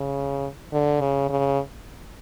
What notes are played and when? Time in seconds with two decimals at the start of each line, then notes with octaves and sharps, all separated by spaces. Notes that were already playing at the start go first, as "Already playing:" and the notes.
Already playing: C#3
0.72 D3
1.01 C#3
1.29 C#3